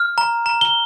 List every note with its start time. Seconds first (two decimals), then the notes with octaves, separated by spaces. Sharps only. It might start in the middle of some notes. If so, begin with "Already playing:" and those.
Already playing: F6
0.18 A#5
0.46 A#5
0.61 G7